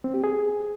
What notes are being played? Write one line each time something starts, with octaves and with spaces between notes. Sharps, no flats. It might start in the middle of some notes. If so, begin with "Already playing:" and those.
C4
G4
G#4